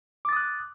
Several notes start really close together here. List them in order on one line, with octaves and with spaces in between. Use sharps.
D6 A6 D#6 F#6